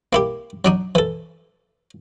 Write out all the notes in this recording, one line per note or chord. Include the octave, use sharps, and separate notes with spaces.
A#3 E4 G4
F#3 D4 D#4
E3 A4